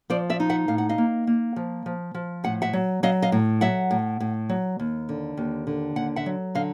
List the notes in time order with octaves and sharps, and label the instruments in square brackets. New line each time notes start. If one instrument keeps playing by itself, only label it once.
[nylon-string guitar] F3 C5 D5
D5 E5
D#4
E5 F#5
A2 F5
F#5
D#5 F5
A#3
A#3
F3
F3
F3
A2 F#5
E5 F#5
F#3
F#3 D#5 F5
D#5 F5
A2
F#3 E5 F#5
A2
A2
F#3
D#2
D3
D#2
D3
D#2 F#5
E5 F#5
F#3
D3 D#5 F5